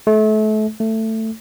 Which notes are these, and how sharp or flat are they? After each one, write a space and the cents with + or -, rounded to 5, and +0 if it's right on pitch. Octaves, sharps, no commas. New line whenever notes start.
A3 -35
A3 +10